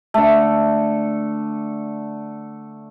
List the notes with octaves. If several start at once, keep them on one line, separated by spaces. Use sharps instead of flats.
D3 A3